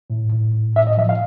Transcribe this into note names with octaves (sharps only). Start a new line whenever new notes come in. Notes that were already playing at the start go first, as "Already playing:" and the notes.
A2
A2
A2
A2 E5
D#5
F3 E5
F5